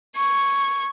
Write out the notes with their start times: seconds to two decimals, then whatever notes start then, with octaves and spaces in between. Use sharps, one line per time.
0.16 C#6 G#6